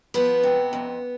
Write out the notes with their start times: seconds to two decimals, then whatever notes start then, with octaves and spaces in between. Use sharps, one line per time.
0.14 F3 B3 B4
0.43 C3
0.73 F2